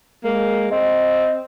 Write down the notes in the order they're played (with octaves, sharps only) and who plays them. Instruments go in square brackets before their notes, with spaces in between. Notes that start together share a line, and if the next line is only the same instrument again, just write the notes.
[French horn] G#3 [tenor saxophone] A#3
[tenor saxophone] C4 [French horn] D#5